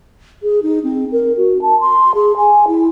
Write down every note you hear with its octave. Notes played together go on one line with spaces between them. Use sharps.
G#4
D#4
C4
A#4
F#4
A5
C6
G#4
G#5
E4